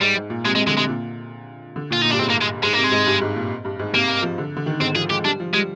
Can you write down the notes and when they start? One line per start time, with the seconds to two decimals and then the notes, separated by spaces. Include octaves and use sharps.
0.01 G#2 G3
0.15 G#2
0.30 A#2
0.45 C3 G#3
0.55 C3 G#3
0.67 D3 G#3
0.77 C3 G#3
0.88 A#2
1.76 D3
1.90 A#2 F4
2.02 A#2 D#4
2.11 G2 D4
2.19 G#2 C4
2.30 A#3
2.41 G#3
2.63 G#2 G#3
2.73 C3 A#3
2.84 G#3
2.91 G#2
3.06 G2
3.21 G#2
3.36 A#2
3.65 G2
3.79 G#2
3.93 C3 A#3
4.22 F3
4.38 D3
4.57 D3
4.66 D#3
4.81 G#2 C4
4.96 F3 G#4
5.10 G#3 G4
5.24 G3 D4
5.40 F3
5.54 G3 G#3